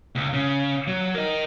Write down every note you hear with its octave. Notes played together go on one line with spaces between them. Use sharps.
C#2
C#3
F#3
A#4 D#5